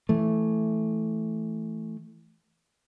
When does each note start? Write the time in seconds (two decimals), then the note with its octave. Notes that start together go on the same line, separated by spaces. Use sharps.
0.09 E3 A3